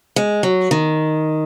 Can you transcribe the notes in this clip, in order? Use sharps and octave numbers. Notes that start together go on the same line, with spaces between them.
G#3
F#3
D#3